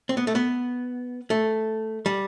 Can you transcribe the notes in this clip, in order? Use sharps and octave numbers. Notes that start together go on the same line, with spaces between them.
C4
B3
A3
B3
A3
G3